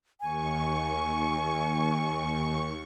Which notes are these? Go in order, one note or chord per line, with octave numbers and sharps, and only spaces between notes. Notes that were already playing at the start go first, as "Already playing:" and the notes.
D#2 G#5 C#6